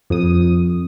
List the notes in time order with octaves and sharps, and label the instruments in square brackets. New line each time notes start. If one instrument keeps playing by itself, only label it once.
[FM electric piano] F2 D#6